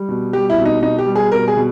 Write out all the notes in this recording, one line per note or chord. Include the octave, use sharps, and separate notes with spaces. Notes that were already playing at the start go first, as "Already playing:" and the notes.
Already playing: G3
B2
G3 G4
E4
B2
D#4
B2 D#4
G4
G3
G#4
B2 A#4
G#4
B2